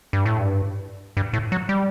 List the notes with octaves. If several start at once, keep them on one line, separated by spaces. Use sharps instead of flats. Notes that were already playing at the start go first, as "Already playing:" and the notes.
G2
A2
G2
G2
A2
F#3
G3